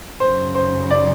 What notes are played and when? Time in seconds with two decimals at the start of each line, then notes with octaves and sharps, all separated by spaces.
0.20 F#2 C#3 F#3 C5
0.55 C5
0.91 D5